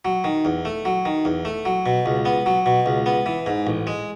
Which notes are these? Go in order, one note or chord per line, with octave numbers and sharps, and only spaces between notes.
F#3
D#3
E2
A3
F#3
D#3
E2
A3
F#3
B2
C#2
B3
F#3
B2
C#2
B3
E3
G#2
A1
G#3